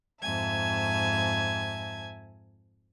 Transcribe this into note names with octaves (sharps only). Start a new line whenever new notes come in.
F2 G#2 E5 G#5 A5 G#6